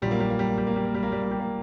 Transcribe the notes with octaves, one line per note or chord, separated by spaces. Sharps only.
A#1 A#2 F#3 G3
A#3
G3
A#3
G3
A#3
G3
A#3
G3
A#3
G3
A#3
G3
A#3
G3
A#3